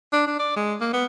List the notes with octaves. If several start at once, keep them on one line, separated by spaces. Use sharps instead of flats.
D4
D4
D5
G#3
A#3
B3